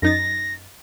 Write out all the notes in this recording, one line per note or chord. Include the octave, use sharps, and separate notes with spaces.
F#2 D#4 A6 A#6